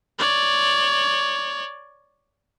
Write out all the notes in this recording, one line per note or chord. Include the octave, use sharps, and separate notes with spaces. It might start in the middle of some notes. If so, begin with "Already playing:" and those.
C#5 D5